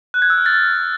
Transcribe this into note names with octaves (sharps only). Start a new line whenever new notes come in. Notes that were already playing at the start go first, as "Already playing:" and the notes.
F#6
G#6
E6
F6
A6